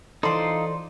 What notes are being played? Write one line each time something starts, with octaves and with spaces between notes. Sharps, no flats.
E3 D#4 F4 A4 C5 D5 C6